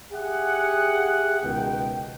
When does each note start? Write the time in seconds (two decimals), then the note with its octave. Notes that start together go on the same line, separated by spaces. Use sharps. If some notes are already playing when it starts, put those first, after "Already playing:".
0.12 G4 G#4 E5 F#5
1.43 C#2 B2 D#3 G5